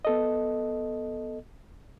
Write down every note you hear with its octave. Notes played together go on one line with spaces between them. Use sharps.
B3 A4 D#5